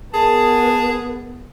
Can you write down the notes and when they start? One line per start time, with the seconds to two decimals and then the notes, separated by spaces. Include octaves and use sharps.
0.14 B3 G#4 A#4 A5